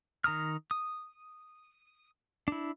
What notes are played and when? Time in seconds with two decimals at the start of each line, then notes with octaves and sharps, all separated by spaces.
0.24 D#3 A#5 D#6 F6
0.71 D#6
2.48 D4 E4